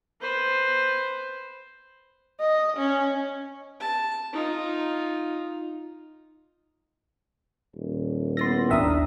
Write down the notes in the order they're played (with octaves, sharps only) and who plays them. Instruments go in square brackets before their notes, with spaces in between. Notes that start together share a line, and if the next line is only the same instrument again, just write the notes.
[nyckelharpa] B4 C5
[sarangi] D#5
C#4
[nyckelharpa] A5
D#4 F4
[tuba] D#1
[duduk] B3 [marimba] E4 A6 [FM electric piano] C6 A#6
[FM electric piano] G#1 E5 D#6 [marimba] D#2 A#5 F6 [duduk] D4